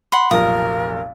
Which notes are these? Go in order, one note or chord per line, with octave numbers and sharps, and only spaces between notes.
F#5 B5 C6
F1 B1 A#2 A#4 F5 D#6